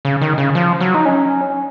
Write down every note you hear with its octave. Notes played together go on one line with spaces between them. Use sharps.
C#3
D#3
C#3
F3
F#3
D#4
C#4